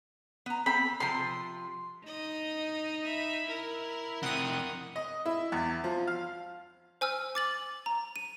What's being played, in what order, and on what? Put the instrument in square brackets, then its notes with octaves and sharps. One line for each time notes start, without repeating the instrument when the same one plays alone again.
[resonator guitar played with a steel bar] B3 A#5
[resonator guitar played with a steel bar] C4 [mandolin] B5
[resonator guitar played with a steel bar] C3 F3 [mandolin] C6
[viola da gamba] D#4 [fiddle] D#5
[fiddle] E5 B5
[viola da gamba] E4 [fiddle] A#4
[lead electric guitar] F2 C3 [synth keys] F#5 D#6
[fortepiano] D#5
E4
E2
F3
F5
[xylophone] C5 G#5 E6 F6
D6 A6 F#7
A#5
D#7